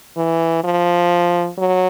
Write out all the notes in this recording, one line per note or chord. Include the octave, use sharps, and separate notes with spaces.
E3
F3
F#3